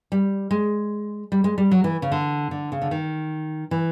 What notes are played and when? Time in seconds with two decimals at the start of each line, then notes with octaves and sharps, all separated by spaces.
0.12 G3
0.51 G#3
1.32 G3
1.44 G#3
1.58 G3
1.71 F#3
1.84 E3
2.02 C#3
2.12 D3
2.51 D3
2.72 C#3
2.82 D3
2.91 D#3
3.71 E3